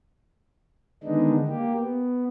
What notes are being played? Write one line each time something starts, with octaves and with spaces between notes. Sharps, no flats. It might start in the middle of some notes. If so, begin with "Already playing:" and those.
D3 D#3 G#3 B3 D4 D#4
A#3 G4
B3